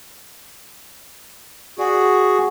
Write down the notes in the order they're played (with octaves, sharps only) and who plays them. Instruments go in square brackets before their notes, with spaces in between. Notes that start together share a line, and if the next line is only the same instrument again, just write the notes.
[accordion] F#4 G#4 [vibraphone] D5 F#5